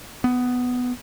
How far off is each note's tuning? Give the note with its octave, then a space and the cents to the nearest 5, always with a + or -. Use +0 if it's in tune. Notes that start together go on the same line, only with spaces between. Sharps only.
B3 +10